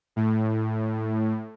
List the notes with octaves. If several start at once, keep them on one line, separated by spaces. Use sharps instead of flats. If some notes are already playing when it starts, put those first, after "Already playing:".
A2